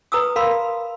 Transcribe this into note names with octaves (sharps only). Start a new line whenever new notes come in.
B4 A#5 D#6 E6
A#4 F5 B5 C6